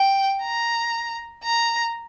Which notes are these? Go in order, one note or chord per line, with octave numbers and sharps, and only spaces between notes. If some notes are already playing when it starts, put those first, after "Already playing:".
Already playing: G5
A#5
A#5